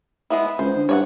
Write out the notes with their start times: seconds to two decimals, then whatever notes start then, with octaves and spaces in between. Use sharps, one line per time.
0.30 G#3 B3 E4
0.59 C#2 C5
0.75 D3
0.89 G2 C#5 D5 F#5